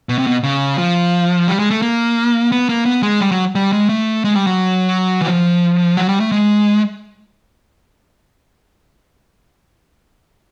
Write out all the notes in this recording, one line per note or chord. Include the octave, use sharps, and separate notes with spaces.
B2
C3
B2
C#3
F3
G3
G#3
A3
A#3
B3
A#3
B3
G#3
G3
F#3
G3
G#3
A3
G#3
G3
F#3
E3
F3
F#3
G3
A3
G#3